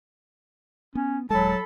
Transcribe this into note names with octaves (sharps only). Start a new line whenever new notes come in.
B3 C#4
D#1 F#3 G#3 A4 A5 B5